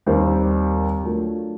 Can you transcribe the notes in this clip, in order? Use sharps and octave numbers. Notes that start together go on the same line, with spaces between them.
D#2 D#3 G3 C4
F#3 A3 D4 F4 A#4